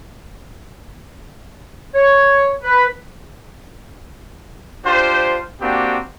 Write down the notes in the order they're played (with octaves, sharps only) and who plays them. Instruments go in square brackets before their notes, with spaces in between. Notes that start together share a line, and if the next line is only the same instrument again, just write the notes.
[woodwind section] C#5
B4
[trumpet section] D4 F4 G4 C5
A#3 C4 D4 F#4 G4